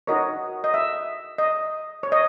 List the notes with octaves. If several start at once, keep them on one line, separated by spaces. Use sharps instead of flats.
D#4 F#4 A#4 C#5 D#5
D#5
E5
D#5
C#5
D#5